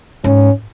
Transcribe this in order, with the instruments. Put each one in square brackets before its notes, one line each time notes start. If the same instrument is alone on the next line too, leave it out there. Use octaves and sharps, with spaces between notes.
[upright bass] G#2 [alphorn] C#4